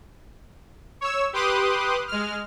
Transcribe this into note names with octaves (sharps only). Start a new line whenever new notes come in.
C#5 E6
G4 B4 C6 D6 D#6 F#6
G#3 F6